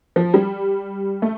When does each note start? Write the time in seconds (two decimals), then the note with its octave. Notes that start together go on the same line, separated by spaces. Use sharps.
0.16 F3
0.34 G3
1.22 A3